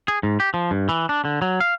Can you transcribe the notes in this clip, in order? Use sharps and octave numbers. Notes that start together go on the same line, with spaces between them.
G#4
G#2
G4
F3
G2
E3
D4
D3
F#3
F5